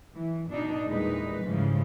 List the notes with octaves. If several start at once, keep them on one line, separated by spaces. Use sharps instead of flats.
E3
B2 D4 D#4
E2 A#2 G3 G#3 D#4 B4
G#2 C#3 E3 F3 G3